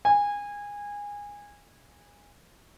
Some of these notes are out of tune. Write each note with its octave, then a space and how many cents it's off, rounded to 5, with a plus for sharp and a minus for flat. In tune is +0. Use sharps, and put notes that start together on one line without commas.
G#5 -20